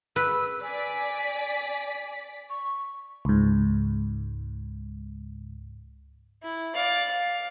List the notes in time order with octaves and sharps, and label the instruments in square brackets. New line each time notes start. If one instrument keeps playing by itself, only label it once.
[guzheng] B4 [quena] E6
[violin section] D5 B6 [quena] G#5
[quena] C#6
[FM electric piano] C#2 G#2
[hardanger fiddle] E4
D5 F5
F5